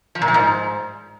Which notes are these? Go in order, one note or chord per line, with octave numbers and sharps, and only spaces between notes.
F3
A#2
F3
G#2